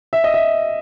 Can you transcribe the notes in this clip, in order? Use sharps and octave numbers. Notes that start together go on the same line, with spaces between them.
E5
D#5
E5